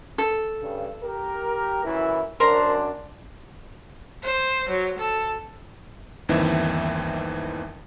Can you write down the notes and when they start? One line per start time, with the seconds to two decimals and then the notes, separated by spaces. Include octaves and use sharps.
0.18 A4
0.61 G2 C#3
1.02 G4 A#4
1.84 F#2 E3 E4
2.40 F#2 D4 A#4 C5 A#5
4.23 C5
4.69 F#3
4.99 A4
6.28 G1 D#2 D#3 E3 C4 E5